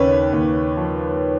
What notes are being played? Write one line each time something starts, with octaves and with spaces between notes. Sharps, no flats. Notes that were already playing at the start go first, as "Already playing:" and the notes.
Already playing: D#2 C#3 B4 C#5
D#2
F3